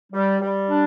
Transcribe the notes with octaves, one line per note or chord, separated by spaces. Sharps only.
G3
G3
D4